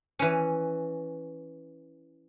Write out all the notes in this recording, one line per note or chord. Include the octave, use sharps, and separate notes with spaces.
E3 C#4